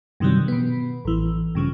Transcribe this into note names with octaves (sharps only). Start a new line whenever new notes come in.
G2 C3 D#3 E3 F#3 G3
B2 B3
A1 E3
G2 C#3 F3